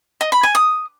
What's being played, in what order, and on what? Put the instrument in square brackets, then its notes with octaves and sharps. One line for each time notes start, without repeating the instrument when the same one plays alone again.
[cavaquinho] D#5
B5
G#5
D#6